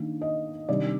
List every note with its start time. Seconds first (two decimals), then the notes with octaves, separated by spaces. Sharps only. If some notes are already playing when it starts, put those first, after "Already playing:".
Already playing: D#3 A#3 D4
0.22 D#5
0.69 C3 D#3 G3 D4 D5